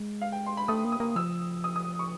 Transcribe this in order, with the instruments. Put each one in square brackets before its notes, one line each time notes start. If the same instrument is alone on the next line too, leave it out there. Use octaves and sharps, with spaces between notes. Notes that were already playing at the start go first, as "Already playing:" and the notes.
Already playing: [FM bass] G#3
[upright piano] F5
G5
C6
B5
[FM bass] A3 [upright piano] D#6
[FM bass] A#3
[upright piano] D#6
[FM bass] A#3
[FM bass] F3 [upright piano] E6
[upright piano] D#6
D#6
C#6